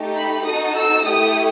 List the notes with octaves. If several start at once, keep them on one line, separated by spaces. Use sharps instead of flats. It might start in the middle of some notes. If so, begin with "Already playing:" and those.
Already playing: A3 D#4 G4
B5
D#4 F#4 A4 D#6
E6
A3 E4 G4 D#6